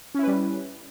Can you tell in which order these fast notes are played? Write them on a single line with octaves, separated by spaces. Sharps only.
C#4 E4 B4 G3